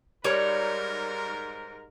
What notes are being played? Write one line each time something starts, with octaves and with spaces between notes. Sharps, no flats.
G#2 G3 A#4 C#5